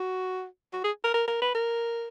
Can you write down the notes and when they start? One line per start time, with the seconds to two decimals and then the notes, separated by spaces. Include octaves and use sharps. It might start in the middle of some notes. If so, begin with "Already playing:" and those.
Already playing: F#4
0.73 F#4
0.84 G#4
1.04 A#4
1.14 A#4
1.28 A#4
1.42 B4
1.55 A#4